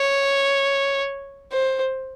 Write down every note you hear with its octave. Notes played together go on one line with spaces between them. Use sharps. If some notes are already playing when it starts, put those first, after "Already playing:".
Already playing: C#5
C5